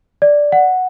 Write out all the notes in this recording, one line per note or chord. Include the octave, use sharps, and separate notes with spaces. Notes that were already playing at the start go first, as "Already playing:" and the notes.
D5
F#5